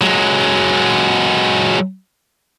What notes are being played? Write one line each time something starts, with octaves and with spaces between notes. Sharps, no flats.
F#3 G#3